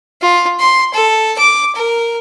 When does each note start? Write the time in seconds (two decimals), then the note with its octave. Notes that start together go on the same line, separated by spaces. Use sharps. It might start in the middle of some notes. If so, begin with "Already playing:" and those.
0.21 F4
0.59 C6
0.94 A4
1.38 D6
1.75 A#4